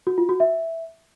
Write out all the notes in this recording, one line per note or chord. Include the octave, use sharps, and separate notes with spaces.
F#4
F4
F#4
E5